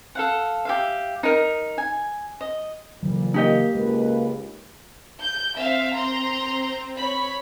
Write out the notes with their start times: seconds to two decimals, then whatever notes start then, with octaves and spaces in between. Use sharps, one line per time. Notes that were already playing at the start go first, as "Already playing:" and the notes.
0.15 A4 F5 F#5
0.65 G4 E5 F5
1.23 D#4 A#4
1.78 G#5
2.41 D#5
3.03 F2 A#2 C#3 E3 F#3 G3
3.34 A#3 D#4 G4 D#5
3.75 C#2 G#3 A#3 B4
5.21 G6
5.55 C4 E5 F5
5.95 A#5 C6
6.98 C#5 B5